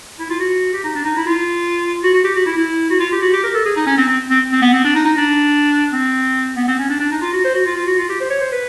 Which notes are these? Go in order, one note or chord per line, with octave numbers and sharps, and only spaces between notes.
E4
F4
F#4
G4
D#4
D4
D#4
E4
F4
F#4
F#4
G4
F#4
E4
E4
F#4
F4
G4
F#4
G4
A#4
A4
G#4
D#4
C#4
C4
C4
C4
C4
B3
C4
D4
D#4
D#4
D4
C4
B3
C4
C#4
D4
D4
D#4
F4
F#4
C5
F#4
F4
F4
F#4
F4
G4
C5
C#5
C5
B4